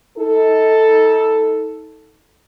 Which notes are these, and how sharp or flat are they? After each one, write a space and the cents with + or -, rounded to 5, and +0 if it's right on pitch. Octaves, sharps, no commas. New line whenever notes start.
D#4 +35 A4 +0